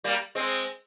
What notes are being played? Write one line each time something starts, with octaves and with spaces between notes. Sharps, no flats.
G3 A#3
G#3 C4